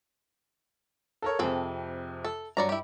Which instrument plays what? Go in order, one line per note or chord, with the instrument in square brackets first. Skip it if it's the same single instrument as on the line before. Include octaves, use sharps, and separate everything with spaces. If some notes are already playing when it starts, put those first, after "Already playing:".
[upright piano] A4 A#4 C#5
[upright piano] F2 C3 [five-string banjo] C4 G#4 A4
[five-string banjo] A4
[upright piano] G2 [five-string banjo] F#3 D5 A#5
[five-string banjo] E4 G4